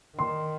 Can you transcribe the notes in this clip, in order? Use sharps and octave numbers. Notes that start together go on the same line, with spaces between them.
D#3 C6